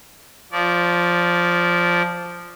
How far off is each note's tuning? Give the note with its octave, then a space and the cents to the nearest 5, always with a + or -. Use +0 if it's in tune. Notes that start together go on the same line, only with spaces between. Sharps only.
F3 +0 D5 -25